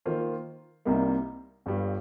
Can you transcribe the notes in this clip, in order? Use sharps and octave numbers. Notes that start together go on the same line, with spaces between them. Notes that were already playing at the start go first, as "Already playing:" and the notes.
D#3 A#3 F4 C5
C2 C3 G3 A#3 D#4
G1 G2 G3